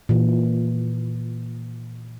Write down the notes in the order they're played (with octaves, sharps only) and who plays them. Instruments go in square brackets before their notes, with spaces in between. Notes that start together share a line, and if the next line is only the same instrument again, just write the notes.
[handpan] A#2 E3